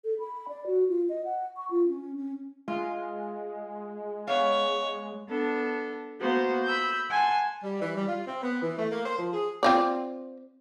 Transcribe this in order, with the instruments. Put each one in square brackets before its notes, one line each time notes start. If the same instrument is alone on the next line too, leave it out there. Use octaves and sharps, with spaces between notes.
[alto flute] A4
B5
D5
F#4
F4
D#5
F#5
C#6
F4
C#4
C#4
[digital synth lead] G#3 [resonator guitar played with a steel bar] F4
[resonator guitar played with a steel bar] B3 F5 [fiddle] C#5
[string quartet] B3 D4 A4
A#3 B3 F#4 C5
B5 E6 G6
F#5 G#5 A5 C6
[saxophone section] G3
E3
G3
F4
C4
B3
E3
A3
A#3
C5
F3
G#4
[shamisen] C4 F4 D5